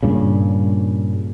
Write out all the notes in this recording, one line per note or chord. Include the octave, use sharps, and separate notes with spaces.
G2 A#2 C#3